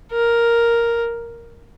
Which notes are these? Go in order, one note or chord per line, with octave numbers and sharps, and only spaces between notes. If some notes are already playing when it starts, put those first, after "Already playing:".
A#4